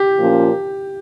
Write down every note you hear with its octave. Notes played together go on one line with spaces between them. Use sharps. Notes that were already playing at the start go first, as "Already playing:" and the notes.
Already playing: G4
A#2 F3 A#3 C#4